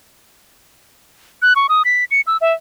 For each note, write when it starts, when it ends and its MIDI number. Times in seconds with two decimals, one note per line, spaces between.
1.42 1.54 90
1.56 1.67 85
1.69 1.83 87
1.85 2.04 95
2.11 2.21 97
2.27 2.37 88
2.41 2.53 76